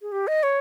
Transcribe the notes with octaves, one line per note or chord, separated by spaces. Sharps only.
G#4
G4
D#5
C#5